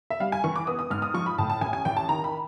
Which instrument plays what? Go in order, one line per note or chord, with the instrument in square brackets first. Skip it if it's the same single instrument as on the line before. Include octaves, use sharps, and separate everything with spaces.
[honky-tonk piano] E5
G3 F5
G#5
E3 C#6
D6
B3 D#6
D#6
G#2 F6
D#6
F3 C#6
B5
A2 A5
A5
A1 G#5
G#5
A1 G5
A5
D#3 A#5
B5